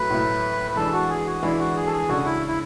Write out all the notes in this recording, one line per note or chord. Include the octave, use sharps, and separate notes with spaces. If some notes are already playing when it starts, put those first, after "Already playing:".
Already playing: A2 F#3 A3 B4
A2 F#3 A3
B4
E3 G#3 D4 A4
F#4
G#4
F#4
E3 G#3 D4 E4
F#4
G#4
A4
G#4
C#3 G#3 D4 F#4 A4
E4
E4